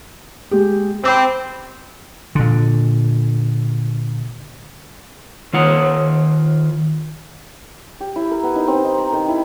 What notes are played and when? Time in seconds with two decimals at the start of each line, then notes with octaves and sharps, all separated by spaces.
0.51 G#3 G4
1.04 C4 B5 D6 E6
2.35 A#2 D3
5.53 D#3 F4 F#5
8.00 G4
8.16 E4
8.31 A#4
8.43 B3
8.56 D#4
8.68 C4
8.84 D#4
8.98 A#5
9.13 D#3
9.28 E4